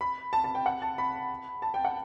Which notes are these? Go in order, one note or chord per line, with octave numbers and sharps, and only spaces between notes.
B5
A5
A5
G5
F#5
A5
B5
A5
G5
F#5